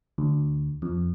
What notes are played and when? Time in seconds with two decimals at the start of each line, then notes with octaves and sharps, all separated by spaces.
0.18 D2
0.82 F2